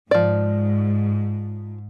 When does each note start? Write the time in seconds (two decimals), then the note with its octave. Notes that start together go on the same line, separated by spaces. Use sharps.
0.11 G#2 F3 D5